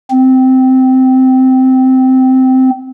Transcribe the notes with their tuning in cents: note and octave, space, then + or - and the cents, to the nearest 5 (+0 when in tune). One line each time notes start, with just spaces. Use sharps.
C4 -10